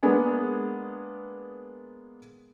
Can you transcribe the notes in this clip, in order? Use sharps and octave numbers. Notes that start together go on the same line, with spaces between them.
G#3 A#3 B3 D4 G#4